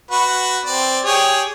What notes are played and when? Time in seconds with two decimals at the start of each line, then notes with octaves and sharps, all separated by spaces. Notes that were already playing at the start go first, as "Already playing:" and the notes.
0.11 F#4 B4
0.66 C4 D5
1.05 G4 G#4 C#5